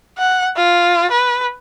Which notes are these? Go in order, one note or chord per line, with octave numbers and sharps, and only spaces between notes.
F#5
F4
B4